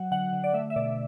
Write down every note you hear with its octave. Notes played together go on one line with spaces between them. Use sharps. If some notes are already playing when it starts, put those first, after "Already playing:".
Already playing: F#3 F#5
D3 F#5
D3
D5
A3 E5
E5
B2 D5